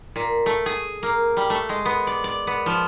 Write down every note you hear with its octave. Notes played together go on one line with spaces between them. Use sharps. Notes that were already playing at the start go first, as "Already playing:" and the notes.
A#2
A3
G#4
A#3
G3
A3
G#3
B3
D5
D5
B3
F3